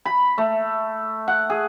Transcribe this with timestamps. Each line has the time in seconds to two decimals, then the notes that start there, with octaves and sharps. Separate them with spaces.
0.05 B5
0.38 A3
1.28 F#5
1.50 G#4